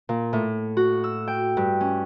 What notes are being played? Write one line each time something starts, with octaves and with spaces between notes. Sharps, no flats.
A#2
A2
F#4
E6
G5
G2
C#4